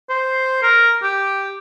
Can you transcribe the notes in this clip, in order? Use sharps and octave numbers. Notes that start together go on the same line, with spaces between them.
C5
A#4
G4